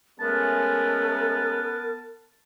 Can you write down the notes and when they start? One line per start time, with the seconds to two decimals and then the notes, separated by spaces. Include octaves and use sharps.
0.20 G#3 A3 B3 C#4 A#4 A5